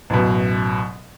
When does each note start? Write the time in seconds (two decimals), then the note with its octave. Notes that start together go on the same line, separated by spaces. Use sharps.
0.10 A1 F#2 B2